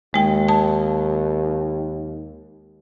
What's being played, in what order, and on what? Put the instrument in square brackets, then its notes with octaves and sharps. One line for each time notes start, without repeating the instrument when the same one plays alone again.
[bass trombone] D#2 [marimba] G#3 G5
[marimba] A5